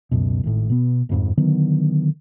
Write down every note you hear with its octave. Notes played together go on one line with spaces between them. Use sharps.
C#2 F#2 B2
G#1 A2
B2 B3
D1 F2 G#2
D3 D#3 F#3 B3